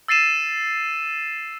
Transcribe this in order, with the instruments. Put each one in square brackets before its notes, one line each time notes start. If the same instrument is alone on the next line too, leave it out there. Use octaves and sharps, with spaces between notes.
[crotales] E6 A6 C7 D#7 E7